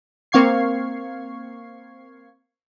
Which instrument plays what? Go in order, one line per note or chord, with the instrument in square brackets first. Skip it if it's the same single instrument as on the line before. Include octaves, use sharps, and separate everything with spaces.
[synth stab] A#3 C4 F5 C#6 G#6 C7